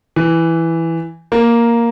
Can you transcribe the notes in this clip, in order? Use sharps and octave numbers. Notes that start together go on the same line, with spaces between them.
E3
A#3